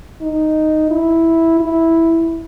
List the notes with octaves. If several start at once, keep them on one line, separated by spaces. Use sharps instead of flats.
D#4
E4
E4